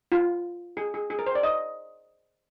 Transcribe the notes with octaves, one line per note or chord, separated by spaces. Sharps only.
F4
G#4
G#4
G#4
A#4
C5
D5
D#5